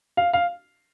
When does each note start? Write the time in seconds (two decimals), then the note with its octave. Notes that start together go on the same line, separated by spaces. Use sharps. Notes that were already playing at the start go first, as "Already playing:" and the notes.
0.17 F5
0.33 F5